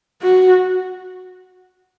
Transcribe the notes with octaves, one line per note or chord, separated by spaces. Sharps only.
F#4